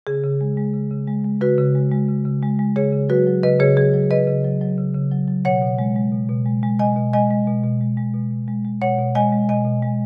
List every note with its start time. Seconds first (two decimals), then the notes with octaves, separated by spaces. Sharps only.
0.07 C#3 G#4
0.24 C#3
0.41 G#3
0.57 G#3
0.74 C#3
0.91 C#3
1.07 G#3
1.24 G#3
1.41 C#3 F#4 B4
1.58 C#3
1.75 G#3
1.91 G#3
2.09 C#3
2.25 C#3
2.43 G#3
2.59 G#3
2.76 C#3 G#4 C#5
2.93 C#3
3.09 F#3 F#4 B4
3.27 F#3
3.43 C#3 B4 D#5
3.60 C#3 G#4 C#5
3.77 F#3 G#4
3.94 F#3
4.11 C#3 B4 D#5
4.27 C#3
4.44 F#3
4.61 F#3
4.78 C#3
4.95 C#3
5.11 F#3
5.28 F#3
5.45 B2 C#5 F#5
5.62 B2
5.79 G#3
5.96 G#3
6.12 B2
6.29 B2
6.46 G#3
6.63 G#3
6.79 B2 D#5 G#5
6.96 B2
7.13 G#3 D#5 G#5
7.30 G#3
7.47 B2
7.64 B2
7.81 G#3
7.97 G#3
8.14 B2
8.31 B2
8.48 G#3
8.65 G#3
8.82 B2 C#5 F#5
8.99 B2
9.15 G#3 D#5 G#5
9.32 G#3
9.49 B2 D#5 G#5
9.65 B2
9.82 G#3